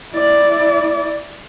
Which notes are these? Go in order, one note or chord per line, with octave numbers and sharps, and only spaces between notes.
E4 D5